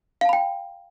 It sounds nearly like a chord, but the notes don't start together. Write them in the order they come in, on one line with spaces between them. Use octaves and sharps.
F5 A5 B5 G5